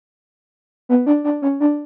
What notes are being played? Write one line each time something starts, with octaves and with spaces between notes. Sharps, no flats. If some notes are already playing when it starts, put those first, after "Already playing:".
B3
D4
D4
C#4
D4